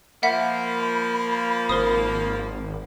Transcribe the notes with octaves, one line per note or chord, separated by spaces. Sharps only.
F3 A#3 E5 F#5 B5 B6
G#1 A#4 C5 D#6